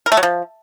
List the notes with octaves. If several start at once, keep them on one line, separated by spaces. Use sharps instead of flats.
A#4
A3
F#3
F3